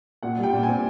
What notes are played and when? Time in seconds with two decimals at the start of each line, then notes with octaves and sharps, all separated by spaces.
0.23 A#2 F#5
0.38 G3
0.43 G5
0.53 A#2
0.63 G#5
0.69 C4